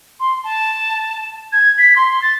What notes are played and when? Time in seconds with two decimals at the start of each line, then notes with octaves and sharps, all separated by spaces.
0.20 C6
0.44 A5
1.52 G#6
1.78 B6
1.96 C6
2.22 A6